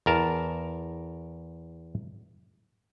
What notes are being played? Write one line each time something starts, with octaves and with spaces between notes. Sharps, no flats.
E2 A#4 A5